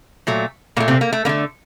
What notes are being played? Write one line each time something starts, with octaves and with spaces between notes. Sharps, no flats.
A#2 F#3 A3
A#2 A3 A#3
C3 C4
A#3
A3
D3 A3 A#3